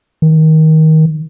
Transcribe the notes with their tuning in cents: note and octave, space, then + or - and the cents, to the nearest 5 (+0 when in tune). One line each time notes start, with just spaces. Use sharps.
D#3 +20